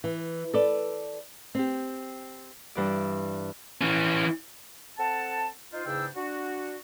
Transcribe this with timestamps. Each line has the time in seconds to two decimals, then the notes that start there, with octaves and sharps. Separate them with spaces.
0.04 E3
0.54 A4 B4 D5
1.55 C4 G4
2.75 G2 E3 D5
3.81 E3 C#4
4.98 C4 A4 F#5 A5
5.73 D#4 F4 C5
5.86 E2 G#2 C#3 D4 G5 E6
6.15 D4 F#4